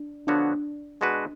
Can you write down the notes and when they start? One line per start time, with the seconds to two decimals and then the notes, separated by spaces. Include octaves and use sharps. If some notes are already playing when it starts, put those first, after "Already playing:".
Already playing: D4
0.27 D3 F3 B3 D4 F#4 C#5
1.01 B2 G#3 D4 F#4 B4